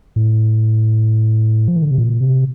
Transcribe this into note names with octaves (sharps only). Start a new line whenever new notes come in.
A2
F3
E3
D3
C3
A#2
C3